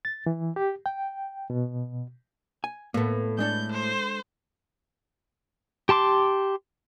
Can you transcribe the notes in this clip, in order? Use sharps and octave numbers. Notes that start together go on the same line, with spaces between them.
A6
E3
G4
G5
B2
G#5
A2 A#3 B3 A4
G#3 D4 A4 G6
C5
G4 A5 C6 D6